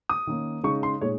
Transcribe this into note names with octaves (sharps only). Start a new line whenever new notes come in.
D#6
D#3 A#3 C#4
C#3 G#3 D#4 C#6
C6
A#2 G#3 D#4 C#5